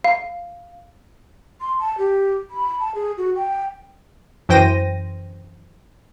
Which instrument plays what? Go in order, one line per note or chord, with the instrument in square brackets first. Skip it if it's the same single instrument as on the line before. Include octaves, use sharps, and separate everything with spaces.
[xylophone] F5
[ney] C6
A5
G4
B5
A5
G#4
F#4
G5
[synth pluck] F#2 E3 C5 G5 A#6 D#7